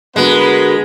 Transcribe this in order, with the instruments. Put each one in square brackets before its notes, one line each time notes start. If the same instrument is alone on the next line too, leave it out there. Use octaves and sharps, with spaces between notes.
[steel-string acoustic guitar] D3 F#4 A#4 [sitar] G#3 [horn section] B3 B4